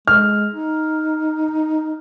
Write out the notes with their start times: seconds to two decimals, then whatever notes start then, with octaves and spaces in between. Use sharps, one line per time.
0.07 G#3 F6
0.54 D#4